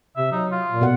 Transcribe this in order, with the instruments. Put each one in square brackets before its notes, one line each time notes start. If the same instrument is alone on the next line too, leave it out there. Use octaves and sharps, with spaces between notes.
[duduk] C3 [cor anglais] E5
[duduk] F#3 [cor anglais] D#4
[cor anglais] F4
[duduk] A#2
[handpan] B2 F#5